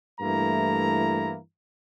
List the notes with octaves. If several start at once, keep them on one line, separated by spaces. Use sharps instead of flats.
G2 E3 A3 A#3 E4 A#5